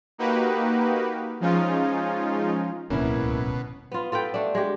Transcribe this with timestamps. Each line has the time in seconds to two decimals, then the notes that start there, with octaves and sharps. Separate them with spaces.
0.18 A#3 D#4 F#4 G4 B4
1.40 F3 G#3 C#4 D#4 F4
2.90 D1 C#2 B2 A#3 C#4 E4
3.92 B3 F4
4.12 F4 A4 B4 G5
4.34 A3 D4
4.55 G#3 G4